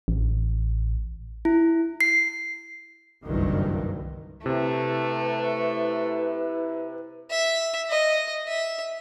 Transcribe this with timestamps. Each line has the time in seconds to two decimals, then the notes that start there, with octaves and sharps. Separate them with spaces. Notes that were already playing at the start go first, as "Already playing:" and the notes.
0.08 A1
1.45 E4
2.01 C7
3.24 F#1 C2 G2 D#3 E3
4.46 C3 A3 E4 B4
7.30 E5
7.90 D#5
8.48 E5